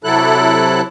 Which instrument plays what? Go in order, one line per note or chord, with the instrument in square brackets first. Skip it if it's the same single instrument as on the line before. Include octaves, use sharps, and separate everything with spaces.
[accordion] C3 F#3 E4 A4 F#6